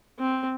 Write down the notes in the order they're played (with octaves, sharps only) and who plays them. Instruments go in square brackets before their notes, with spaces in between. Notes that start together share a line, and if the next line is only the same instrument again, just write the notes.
[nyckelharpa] C4